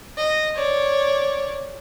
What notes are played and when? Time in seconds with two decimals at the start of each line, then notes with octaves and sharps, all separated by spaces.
0.17 D#5
0.55 C#5 D5